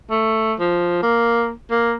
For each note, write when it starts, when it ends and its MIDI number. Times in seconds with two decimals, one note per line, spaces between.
0.10 0.54 57
0.59 0.99 53
1.03 1.51 58
1.71 1.94 58